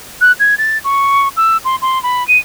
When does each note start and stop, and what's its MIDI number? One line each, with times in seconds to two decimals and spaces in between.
0.21 0.32 90
0.40 0.55 92
0.58 0.78 93
0.84 1.28 85
1.37 1.57 88
1.65 1.76 84
1.82 2.01 84
2.03 2.26 83
2.28 2.38 99